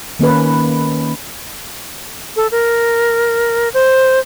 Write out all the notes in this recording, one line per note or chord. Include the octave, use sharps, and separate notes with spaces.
D#3 A#3 C#4 B4
A4
A#4
C5